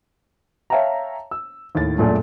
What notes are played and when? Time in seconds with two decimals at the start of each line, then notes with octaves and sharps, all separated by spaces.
0.70 C#5 E5 F5 G5 A5 A#5
1.31 E6
1.75 D#2 A2 A6
1.98 F#2 A#2 G#3 A3 D4